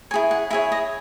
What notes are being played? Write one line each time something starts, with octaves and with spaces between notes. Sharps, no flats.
E4 G#4 C#5 G#5
F#5
E4 G#4 C#5 E5
D#5